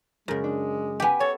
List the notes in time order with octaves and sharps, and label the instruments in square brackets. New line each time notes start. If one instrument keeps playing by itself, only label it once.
[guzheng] F#2 C#3 [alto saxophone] G#3 [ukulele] A#4
[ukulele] D4
[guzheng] B3 G4 [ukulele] G5 G#5
[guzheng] A4 [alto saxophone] C#5